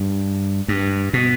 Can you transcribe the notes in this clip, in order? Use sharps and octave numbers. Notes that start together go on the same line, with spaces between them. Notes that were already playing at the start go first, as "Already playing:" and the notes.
Already playing: G2
G2
B2